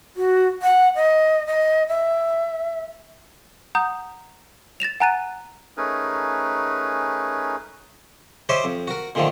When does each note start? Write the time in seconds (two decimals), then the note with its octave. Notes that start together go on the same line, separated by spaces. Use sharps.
0.16 F#4
0.62 F#5
0.96 D#5
1.47 D#5
1.88 E5
3.75 F#5 A#5 D#6 G6
4.80 A6 A#6 E7 F7
5.00 F#5 G#5 A#5 F#6 A6 D#7
5.77 A3 C#4 D#4 G#4 A#4 B4
8.49 G4 C5 C#5 D#5 E5 G5
8.64 F2
8.88 F#4 A#4
9.15 A#2 D3 D#3 F3 A3